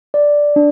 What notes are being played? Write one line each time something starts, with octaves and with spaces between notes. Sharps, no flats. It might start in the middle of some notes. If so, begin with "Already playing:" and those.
D5
D4